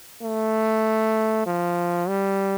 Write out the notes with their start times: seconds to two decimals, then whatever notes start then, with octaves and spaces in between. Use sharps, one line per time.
0.22 A3
1.46 F3
2.08 G3